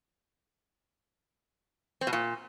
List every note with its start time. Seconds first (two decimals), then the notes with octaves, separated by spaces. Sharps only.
2.01 C4
2.07 B2
2.13 A#2